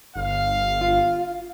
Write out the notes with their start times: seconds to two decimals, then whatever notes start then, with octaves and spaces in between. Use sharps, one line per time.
0.16 G1 F5
0.81 F4